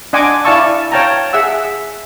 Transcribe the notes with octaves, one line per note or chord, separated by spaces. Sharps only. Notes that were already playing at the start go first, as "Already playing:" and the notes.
D4 D#5 F#5 G#5 C6 D6
E4 D5 F5 A5 C#6 E6
C#5 F5 G5 A5 A#5
G#4 E5 F#5 E6